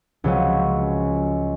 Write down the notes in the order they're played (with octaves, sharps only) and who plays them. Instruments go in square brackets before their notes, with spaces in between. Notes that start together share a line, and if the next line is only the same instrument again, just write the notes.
[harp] C#2 F3 F#3 C#4